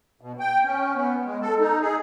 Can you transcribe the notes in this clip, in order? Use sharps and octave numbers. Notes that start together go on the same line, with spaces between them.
B2
G5
C#4
B3
G#3
A4
D#4
G#4